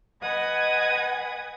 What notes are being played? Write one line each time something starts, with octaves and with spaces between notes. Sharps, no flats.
B4 D#5 F#5 G#5 D#6 G#6